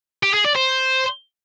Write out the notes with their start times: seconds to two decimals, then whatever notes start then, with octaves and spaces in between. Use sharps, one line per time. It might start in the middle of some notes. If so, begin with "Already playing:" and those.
0.23 G4
0.34 G#4
0.45 D5
0.56 C5